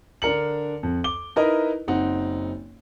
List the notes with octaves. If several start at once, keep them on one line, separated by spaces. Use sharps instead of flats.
D3 D4 A#4 C#7 F#7
F2
D6 G7
D#4 E4 A#4 B4 D#5
F#1 C4 D#4 F#5